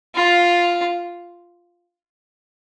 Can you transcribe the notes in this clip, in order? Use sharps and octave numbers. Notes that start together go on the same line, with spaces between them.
F4